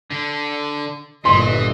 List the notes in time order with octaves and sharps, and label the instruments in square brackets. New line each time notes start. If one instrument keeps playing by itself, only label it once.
[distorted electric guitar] D3
[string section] G1 D#5 [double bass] A#2 [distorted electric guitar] E3 [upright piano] C6